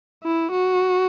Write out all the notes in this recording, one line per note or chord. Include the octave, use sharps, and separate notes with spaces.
E4
F#4